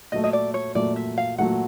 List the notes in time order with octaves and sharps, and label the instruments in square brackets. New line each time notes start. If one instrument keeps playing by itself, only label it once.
[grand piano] A#2 F#3 A3 [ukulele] D#5
[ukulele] D#5
D5
C#5
[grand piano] A#2 F#3 A3 [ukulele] D5
[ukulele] E5
F5
[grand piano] A#2 F#3 A3 [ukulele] F#5